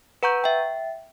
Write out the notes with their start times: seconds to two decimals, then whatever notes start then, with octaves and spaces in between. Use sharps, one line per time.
0.23 B4 F#5 A#5 C#6 G6
0.44 E5 G5